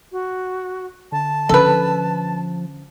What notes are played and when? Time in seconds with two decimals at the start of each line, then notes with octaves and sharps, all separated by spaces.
0.12 F#4
1.12 D3 A5
1.49 D3 F3 C#4 A4 B4